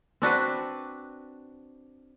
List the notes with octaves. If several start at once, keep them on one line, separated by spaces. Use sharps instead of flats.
C4 D4 F#4 B4